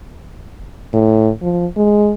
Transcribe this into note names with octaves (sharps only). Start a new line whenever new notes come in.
A2
F3
G#3